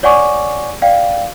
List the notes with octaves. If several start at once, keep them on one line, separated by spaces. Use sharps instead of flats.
C#5 D5 F#5 G#5 C#6 D6
D5 F5 G5